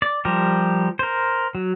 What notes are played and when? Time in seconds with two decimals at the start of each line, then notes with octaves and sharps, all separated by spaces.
0.02 D5
0.25 F3 G3 G4 A#4
0.99 A#4 C5
1.55 F#3